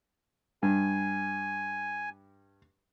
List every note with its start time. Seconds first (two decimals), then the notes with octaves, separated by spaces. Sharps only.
0.63 G2 G#5